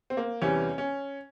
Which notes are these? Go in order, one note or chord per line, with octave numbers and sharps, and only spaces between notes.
C4
A#3
E2 C3 E3 G3 C#4
C#4